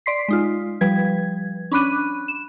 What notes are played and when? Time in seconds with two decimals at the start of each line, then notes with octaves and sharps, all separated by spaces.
0.06 D5 C6 B6 C7
0.28 G#3 D#4 F4
0.81 F3 G3 B4 G#6
1.72 C#4 D4 B5 D6 F#6 D#7
2.28 E7